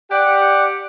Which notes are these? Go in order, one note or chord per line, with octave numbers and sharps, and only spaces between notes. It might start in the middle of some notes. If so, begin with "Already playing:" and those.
G4 D5 F#5